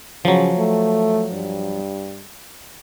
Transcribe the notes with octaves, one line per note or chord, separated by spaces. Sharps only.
C#3 F3 F#3
A3
G2